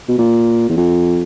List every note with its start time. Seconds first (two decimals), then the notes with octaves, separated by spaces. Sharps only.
0.09 B2
0.18 A#2
0.69 E2
0.77 F2